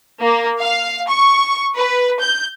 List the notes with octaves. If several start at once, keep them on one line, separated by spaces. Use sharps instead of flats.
A#3
F5
C#6
B4
G6